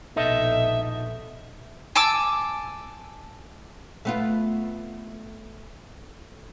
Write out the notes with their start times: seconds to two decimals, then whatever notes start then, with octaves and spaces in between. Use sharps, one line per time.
0.16 A#1 B2 D#4 A4 D#5 E5
1.96 G#5 A5 D6 E6
4.05 A3 B3 F4